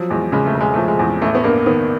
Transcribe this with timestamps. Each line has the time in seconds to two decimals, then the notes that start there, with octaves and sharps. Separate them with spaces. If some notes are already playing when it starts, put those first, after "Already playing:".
Already playing: F3 F#3
0.10 E2 G#3
0.32 C#3 G#3
0.46 A3
0.54 E1
0.61 G#3
0.74 F3 A3
0.88 G#3
0.99 E2
1.22 A1 A3
1.35 B3
1.44 G2 A#3
1.66 D#3 B3